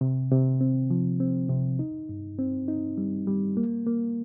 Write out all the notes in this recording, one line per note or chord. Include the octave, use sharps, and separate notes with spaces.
C3
C3
C4
F3
C4
C3
D#4
G2
C4
D#4
G3
G3
A#3
A#3